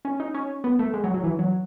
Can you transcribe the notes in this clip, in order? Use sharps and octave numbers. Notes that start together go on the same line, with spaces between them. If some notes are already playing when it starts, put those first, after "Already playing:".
C#4
D#4
C#4
B3
A3
G#3
F#3
F#3
E3
F#3